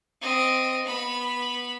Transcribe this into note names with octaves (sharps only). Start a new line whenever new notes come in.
C4 D#5
B3 B5